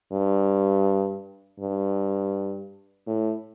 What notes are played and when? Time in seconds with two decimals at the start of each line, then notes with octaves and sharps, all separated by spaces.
0.12 G2
1.60 G2
3.07 A2